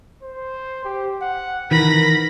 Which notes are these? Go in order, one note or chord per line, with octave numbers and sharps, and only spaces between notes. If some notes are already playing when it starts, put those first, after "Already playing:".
C5
G4
F#5
D#3 E3 A#4 B5 A#6